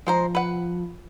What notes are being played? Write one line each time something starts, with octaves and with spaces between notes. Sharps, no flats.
F3 G#3 C5 A#5
B4 F#5